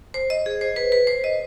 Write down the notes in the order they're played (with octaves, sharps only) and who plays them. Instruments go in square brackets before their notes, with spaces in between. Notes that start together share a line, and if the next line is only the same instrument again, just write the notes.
[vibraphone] C5
D#5
G#4
C5
B4
B4
C5
D#5